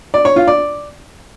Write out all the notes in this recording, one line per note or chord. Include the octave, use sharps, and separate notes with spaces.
D5
C#5
F4
D5